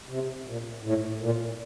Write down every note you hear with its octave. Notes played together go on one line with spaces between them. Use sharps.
C3
A#2
A2
A#2